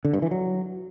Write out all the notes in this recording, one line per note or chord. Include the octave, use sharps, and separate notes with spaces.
D3
G2
E3
F#3